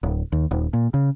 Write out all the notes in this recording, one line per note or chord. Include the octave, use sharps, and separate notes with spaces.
D1
D#2
D#1
A#2
C#3